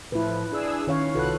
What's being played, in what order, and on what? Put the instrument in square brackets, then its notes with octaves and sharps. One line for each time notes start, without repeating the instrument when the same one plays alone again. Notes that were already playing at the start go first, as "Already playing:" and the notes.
[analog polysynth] A2 F3 [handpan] E4 B4
[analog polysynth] D4 G#4 E6
[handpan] D#3 C#5 F5 [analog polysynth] C#4
[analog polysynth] C2 F#4 F#6 [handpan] F4 A4 B4